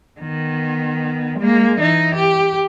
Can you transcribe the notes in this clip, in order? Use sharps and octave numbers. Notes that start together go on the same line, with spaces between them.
D#3 B3
G#3 A#3
E3 D#4
G4